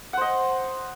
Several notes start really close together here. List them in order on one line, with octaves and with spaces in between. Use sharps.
F#5 C5 D#5